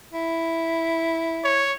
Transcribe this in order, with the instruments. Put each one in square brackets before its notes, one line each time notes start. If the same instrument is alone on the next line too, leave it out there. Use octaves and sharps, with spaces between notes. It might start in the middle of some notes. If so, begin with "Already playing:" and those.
[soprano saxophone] E4
[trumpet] C#5